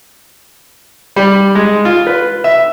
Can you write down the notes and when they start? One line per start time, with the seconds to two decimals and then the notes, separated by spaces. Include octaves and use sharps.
1.16 G3
1.55 G#3
1.85 F4
2.07 B4
2.44 E5